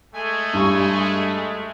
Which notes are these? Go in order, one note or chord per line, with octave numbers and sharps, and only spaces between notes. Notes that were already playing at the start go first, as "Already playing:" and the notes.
G#3 A3 G#5
G2 C#6